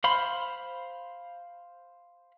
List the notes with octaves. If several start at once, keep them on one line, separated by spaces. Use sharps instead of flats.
C5 F5 B5 C6